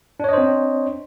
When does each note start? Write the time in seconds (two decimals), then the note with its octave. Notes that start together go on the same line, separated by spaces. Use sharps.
0.20 D4
0.24 C#5
0.29 D#5
0.33 C5
0.38 C4